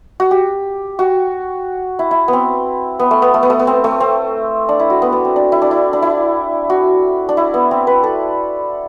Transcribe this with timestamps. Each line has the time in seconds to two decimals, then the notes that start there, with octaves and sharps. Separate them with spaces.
0.20 F#4
0.31 G4
0.99 F#4
1.99 E4
2.11 E4
2.28 B3
2.33 C4
2.99 B3
3.11 A3
3.22 B3
3.34 A3
3.43 B3
3.50 A3
3.59 B3
3.67 C4
3.84 A3
4.00 C4
4.69 D4
4.79 E4
4.90 F#4
5.02 B3
5.13 B3
5.25 C4
5.36 D4
5.52 E4
5.62 D4
5.71 E4
5.93 D4
6.02 E4
6.70 F#4
7.29 D4
7.37 E4
7.54 B3
7.71 C4
7.87 B4
8.04 A4